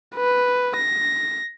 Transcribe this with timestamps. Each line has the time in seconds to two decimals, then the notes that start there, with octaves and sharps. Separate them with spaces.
0.16 B4
0.77 A#6